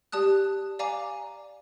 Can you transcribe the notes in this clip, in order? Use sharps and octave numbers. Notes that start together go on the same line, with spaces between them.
G4 D5 A5 D#6 F#6
D5 F5 G#5 A#5 D6